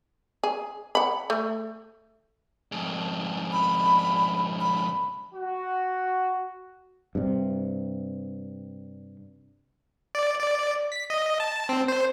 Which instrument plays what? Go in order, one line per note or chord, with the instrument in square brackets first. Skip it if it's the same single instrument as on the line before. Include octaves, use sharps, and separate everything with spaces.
[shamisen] G#4
F#5 B5
A3
[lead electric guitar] F2 G#2
[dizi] B5
B5
[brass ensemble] F#4
[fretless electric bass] G2 C3
[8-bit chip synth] D5
D5
B6
D#5
A5
C4
C5